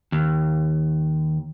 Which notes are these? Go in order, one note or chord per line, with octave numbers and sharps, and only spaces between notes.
D#2